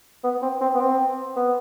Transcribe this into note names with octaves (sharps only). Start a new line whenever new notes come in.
B3
C4
C4
B3
C4
B3